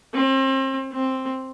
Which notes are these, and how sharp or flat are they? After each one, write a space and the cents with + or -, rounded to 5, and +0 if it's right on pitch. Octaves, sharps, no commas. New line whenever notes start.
C4 +35
C4 +5